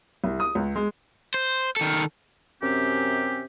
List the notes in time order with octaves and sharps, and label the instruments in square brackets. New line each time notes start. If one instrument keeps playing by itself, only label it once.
[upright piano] C2
D#6
C#2
G#3
[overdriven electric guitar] C5
D#3 A4
[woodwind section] F#2 C3 C4 C#4 G4